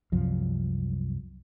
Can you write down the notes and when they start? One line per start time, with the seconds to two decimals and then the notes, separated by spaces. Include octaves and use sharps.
0.12 C2 F#2 F3